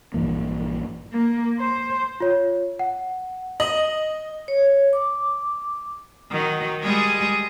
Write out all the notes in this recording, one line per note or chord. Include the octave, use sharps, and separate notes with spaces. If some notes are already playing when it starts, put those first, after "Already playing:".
A#1 G2 E3 A#3
A#3
C5
F4 C#5
F#5
D#5 F#7
C#5
D6
D#3 F#3
G3 G#3 G#4